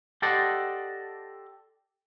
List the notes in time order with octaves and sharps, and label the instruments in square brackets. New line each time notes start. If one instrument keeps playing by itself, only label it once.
[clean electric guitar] G4 A4 C5 D5 D#5 F#5